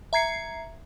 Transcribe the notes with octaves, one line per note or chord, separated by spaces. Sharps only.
E5 A#5 G#6 C7 C#7